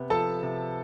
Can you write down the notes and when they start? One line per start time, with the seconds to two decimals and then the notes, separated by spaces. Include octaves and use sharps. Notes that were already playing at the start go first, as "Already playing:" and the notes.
Already playing: C3 B3
0.10 F3 A4 A5
0.43 C3